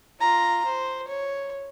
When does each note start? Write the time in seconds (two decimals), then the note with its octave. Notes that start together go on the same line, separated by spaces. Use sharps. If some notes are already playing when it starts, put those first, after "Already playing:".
0.20 F4 A#5
0.65 C5
1.08 C#5